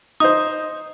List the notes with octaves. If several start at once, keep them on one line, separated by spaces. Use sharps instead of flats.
D#4 C5 D#6